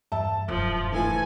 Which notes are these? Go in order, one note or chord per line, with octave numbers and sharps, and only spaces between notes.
E2 G2 E5 A5
E1 F#2 F3
E3 A3 F4 A4 G#5